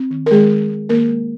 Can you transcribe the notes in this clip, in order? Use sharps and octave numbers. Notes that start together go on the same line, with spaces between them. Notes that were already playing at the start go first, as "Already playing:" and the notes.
Already playing: C4
D#3
A#4
D#3 G#3 G#4
D#3
G#3
D#3 A#3 A#4
G#3